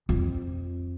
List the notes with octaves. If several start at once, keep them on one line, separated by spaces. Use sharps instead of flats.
F2